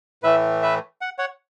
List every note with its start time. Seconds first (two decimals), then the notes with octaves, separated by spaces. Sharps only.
0.23 A2 E3 A3 B4 E5
0.62 B4 E5
1.01 F#5
1.19 C#5 F#5